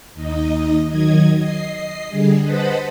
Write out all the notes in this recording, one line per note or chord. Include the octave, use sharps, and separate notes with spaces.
D#2 D#4 D#5
D#3 F#3 D#5 G#6
D#5 C7
D3 G3 G#4
B4 C5 D#5 F#5 A5 B5